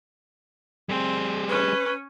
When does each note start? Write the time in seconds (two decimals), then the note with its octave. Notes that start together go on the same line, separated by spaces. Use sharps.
0.89 G3 C4 G#4
1.49 C#4 B4